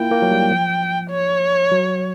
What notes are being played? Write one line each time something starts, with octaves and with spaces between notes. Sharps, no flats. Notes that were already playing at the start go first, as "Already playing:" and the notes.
Already playing: A#3 E4 F4 G5
A#3
F#3
G3
F3
C#5
F#3